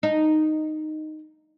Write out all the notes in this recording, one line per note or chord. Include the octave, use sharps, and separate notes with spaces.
D#4